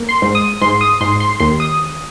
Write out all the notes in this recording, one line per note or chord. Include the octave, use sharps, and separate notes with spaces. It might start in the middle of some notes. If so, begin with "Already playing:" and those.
Already playing: A#3
C6
G#2
D#6
G#2 C6
D#6
G#2 C6
C6
D#2 C6
D#6